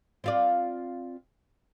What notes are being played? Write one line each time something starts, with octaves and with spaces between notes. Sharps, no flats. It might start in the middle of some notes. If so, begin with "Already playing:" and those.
C4 F4 D5